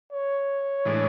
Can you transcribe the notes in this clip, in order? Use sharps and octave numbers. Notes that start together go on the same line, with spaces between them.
C#5
A2 E3 G#3 D4